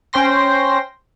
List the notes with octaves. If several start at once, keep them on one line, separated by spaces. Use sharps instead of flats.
C#4 C5 G5 C6 A#6